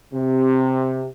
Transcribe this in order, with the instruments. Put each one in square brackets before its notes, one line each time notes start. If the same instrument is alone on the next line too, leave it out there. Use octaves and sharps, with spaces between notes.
[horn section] C3